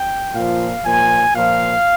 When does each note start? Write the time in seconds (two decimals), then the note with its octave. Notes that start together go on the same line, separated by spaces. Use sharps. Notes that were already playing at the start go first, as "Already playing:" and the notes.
Already playing: G5
0.34 A#2 F3 F5
0.83 A#2 F3 G#5
1.33 A#2 F3 F5